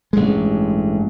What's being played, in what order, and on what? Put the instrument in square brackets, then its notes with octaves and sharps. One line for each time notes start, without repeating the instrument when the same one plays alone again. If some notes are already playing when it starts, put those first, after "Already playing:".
[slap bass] A1 G2 G#3